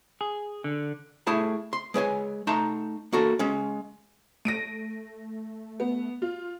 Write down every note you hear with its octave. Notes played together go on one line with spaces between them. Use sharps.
G#4
D3
A3 E4 G#4 A5
C6
G#3 B4 C#5 G#5
A3 D#4 A5 A#5 C6
A#3 F#4 A4
G#3 C#4
A3 A#6 D7 D#7
B3
F4